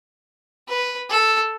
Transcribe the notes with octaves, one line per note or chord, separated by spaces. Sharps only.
B4
A4